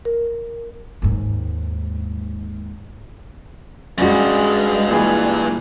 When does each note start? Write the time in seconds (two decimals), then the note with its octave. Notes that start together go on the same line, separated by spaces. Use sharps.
0.05 A#4
1.02 D#2 G#2
3.98 G2 G#3 C#4 F#4
4.89 A#2 E3 G#4